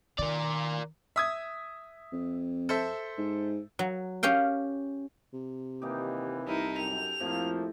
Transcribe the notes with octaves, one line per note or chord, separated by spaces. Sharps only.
D#3 A#4 D5
E5 D#6 G#6
F2
A4 C5 E5
G#2
F#3
C#4 G4 F5 G5
C3
D#2 E3 A#3 D#4 G4
C2 D#4 E4 A4 A#4
F#2 G5 F7
F2 A2 F3 A3 A#3